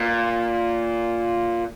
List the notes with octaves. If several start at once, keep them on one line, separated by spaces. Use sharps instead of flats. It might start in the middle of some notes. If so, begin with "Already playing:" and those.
Already playing: A#2